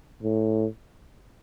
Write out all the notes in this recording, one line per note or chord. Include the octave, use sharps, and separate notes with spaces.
A2